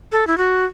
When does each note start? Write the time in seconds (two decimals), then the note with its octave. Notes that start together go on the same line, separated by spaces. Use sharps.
0.12 A4
0.27 E4
0.38 F#4